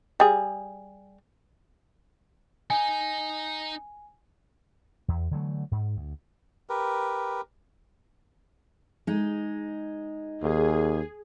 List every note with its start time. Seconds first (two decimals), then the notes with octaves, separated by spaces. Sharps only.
0.20 G3 G#4
2.70 D#4 G#5
5.08 E2
5.31 D3 E3 F#3 A3
5.71 G#2
5.97 D2
6.70 G4 A#4 B4
9.07 G#3 D#4
10.43 D#2 G#4